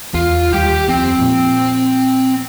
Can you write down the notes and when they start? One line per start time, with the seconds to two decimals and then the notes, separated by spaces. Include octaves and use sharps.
0.14 E2 F4
0.53 D#2 G3 G4 G5
0.89 F2 C4
1.18 A#2 F3